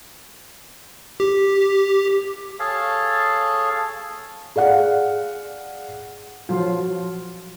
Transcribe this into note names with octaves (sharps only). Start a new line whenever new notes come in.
G4
G#4 A4 C#5 F5 A5
G#4 D5 F5 F#5
F3 F#3 F4